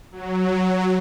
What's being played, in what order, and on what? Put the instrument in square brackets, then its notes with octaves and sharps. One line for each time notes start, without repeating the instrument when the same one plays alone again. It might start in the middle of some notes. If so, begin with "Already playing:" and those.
[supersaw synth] F#3